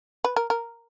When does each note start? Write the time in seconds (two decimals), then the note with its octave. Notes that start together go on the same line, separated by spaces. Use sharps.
0.24 B4
0.36 A#4
0.50 A#4